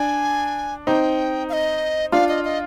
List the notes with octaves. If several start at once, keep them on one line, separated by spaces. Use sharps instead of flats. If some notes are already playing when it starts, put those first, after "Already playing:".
Already playing: D4 G#5
C4 D#4 G5
F5
D#5
D4 F4 F5
D#5
D#5